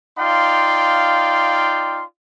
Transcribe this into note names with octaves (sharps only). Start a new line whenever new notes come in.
D#4 F4 D5 F5 G5 C6